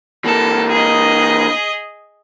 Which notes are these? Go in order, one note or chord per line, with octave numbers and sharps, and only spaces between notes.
E3 A#3 A4
G#4 D#5